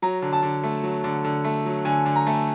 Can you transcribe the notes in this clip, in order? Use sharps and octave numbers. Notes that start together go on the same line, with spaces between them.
F#3 A#5
D3
A5
D3
A3
F#3
D3
D3
A3
F#3
D3 G#5
D3
A#5
A3